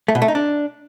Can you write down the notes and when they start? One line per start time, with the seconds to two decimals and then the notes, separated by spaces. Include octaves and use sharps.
0.08 A3
0.15 B2
0.22 A3
0.28 D#4
0.35 D4